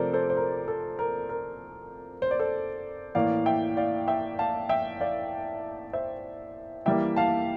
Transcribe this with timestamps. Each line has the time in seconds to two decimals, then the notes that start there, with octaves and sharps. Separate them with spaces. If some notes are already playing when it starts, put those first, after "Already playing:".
Already playing: C3 F3 A3 C4 A4 A#4 C5 D5
0.13 A4 C5
0.30 C5
0.37 A#4
0.68 A4
0.99 A#4
1.29 A#4
2.22 C5
2.31 D5
2.39 A4 C5
3.15 A2 E3 A#3 D5 F5
3.46 E5 G5
3.77 D5 F5
4.08 E5 G5
4.39 F5 A5
4.69 E5 G5
5.01 D5 F5
5.93 C5 E5
6.86 E3 G3 A#3 E5 G5
7.16 F5 A5